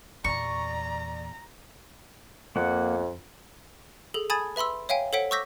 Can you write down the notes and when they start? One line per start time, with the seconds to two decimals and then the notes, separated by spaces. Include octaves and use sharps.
0.24 E2 A#2 D5 A#5 C#6
2.56 F2 A#3 F#5
4.14 G#4 A4
4.30 G#5 A5 B5 D#6 G#6 A6
4.56 B4 E5 B5 C6 E6
4.89 C#5 E5 F5 G5 G#5
5.13 A4 C5 C#5 F#5 B6 D7
5.31 C#6 D6 E6 G6 A#6 B6